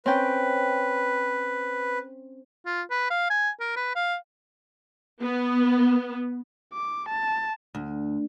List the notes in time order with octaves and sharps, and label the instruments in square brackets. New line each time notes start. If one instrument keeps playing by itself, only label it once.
[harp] C4 C#4 G5 [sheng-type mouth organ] B4
[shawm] F4
B4
F5
G#5
A#4
B4
F5
[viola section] B3
[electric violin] D6
A5
[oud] D2